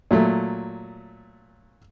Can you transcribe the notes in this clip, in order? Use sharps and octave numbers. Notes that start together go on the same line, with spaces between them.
A#2 F#3 A3